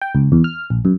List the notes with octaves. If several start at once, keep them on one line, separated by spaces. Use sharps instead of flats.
G5
C#2
E2
F6
A#1
F#2